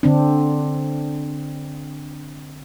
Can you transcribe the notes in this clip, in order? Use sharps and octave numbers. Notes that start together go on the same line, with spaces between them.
D3 C4 D4